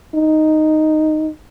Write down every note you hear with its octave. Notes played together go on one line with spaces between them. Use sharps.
D#4